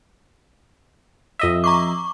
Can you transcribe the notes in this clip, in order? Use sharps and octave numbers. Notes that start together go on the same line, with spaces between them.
F2 D#5 E5
A#5 C#6 D6